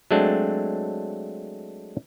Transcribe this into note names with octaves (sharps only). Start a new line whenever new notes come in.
F#3 G#3 A3 C4 D4